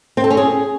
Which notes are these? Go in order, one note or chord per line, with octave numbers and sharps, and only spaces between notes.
C4
A4
C#4
G#4